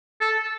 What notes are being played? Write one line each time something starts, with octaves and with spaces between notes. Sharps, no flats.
A4